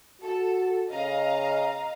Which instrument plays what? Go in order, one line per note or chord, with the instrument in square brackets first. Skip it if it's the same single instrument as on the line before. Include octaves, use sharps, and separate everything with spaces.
[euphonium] F#4 [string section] A4
[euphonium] C#3 [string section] D#5 F5 A#5